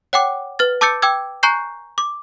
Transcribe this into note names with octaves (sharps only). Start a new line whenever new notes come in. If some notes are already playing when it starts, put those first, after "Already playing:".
C#5 F#5 G5 D6
B4 F6 A6
A5 D6 E6 G6 A6 C#7
G5 D6 E6 G#6
G#5 A#5 C#6 F#6 G6 C7
D6